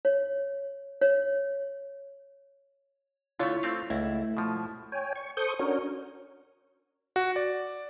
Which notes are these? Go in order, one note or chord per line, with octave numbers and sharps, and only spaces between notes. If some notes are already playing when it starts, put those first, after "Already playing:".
C#5
C#5
D3 A3 E4 F4 C#5
A3 C4 F5
C#2 A3 E4
B2 F3
C#5 G5 G#5
C#6
A4 C5 C#6 D#6 G6
C#4 D4 F#4 A#4 C#5
F#4
D5